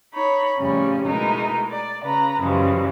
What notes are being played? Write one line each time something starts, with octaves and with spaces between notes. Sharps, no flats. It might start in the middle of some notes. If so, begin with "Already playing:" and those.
D#4 C#5 B5
F2 A2 C#3 G3 C#4
B2 G#3 A3 D#4 E4 A#4
D5
C#3 B4 A#5
F#2 C#3 E3 F3 G3 G#3